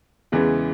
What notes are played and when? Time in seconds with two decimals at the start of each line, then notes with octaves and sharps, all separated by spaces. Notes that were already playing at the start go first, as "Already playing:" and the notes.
0.32 E2 C#3 E3 G#3 B3